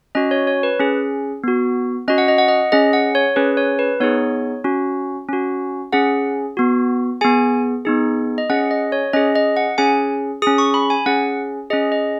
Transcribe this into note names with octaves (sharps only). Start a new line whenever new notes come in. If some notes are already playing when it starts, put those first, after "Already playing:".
C#4 F#4 D#5
C#5
C#5
B4
C#4 G#4
B3 F#4
C#4 F#4 D#5
F#5
D#5
F#5
D#5
C#4 G#4 D#5
F#5
C#5
C#4 G#4 B4
C#5
B4
B3 D#4 G#4 C#5
C#4 F#4
C#4 F#4
C#4 G#4 F#5
B3 F#4
B3 G#4 G#5
B3 D#4 G#4
D#5
C#4 G#4 F#5
D#5
C#5
C#4 G#4 D#5
D#5
F#5
C#4 G#4 G#5
C#4 G#4 D#6
C#6
B5
G#5
C#4 G#4 F#5
C#4 G#4 D#5
D#5